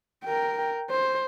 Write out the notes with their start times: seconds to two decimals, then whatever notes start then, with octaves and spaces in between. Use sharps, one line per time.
0.24 A#4 G5
0.91 C5